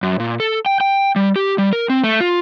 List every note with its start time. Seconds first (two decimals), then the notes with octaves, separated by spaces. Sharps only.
0.03 F#2
0.20 A#2
0.40 A4
0.66 G5
0.81 G5
1.16 G3
1.36 G4
1.58 G3
1.73 A#4
1.90 C4
2.04 A3
2.20 F4